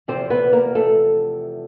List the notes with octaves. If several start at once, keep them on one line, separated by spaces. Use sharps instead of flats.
E2 C3 F3 C4 C5
B3 B4
A#3 A#4
A3 A4